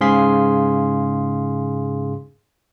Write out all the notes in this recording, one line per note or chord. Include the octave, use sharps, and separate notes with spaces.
G#2 C#3 G#4 F5 C6 B6